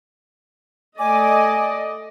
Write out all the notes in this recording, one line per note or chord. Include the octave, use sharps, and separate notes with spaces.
A3 D5 D#5 G#5 D6